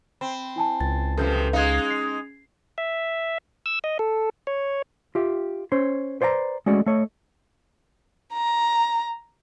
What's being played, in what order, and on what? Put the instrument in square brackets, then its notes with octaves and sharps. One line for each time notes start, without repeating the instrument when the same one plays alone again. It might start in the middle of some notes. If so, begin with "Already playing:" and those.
[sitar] C4 [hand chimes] B5
[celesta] E4 G#5 A5
[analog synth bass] C#2 [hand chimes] A6
[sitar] F#2 C3 F3 [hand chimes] A4 B4 G6
[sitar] G#3 D#4 [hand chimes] C#4 G#4 G#6 [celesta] F5
[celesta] C7
[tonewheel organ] E5
E6
D#5
A4
C#5
[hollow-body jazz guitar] F4 G4 E5
C#4 C5 C#5
B4 C5 D5 F#5 A#5
G#3 A3 C#4 F#4 D5 D#5
A3 C#5 D#5
[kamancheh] A#5